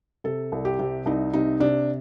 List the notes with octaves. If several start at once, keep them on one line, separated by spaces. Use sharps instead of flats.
C3 A4
C2
G4
C3
C2 D#4
C3 D#4
C3 D4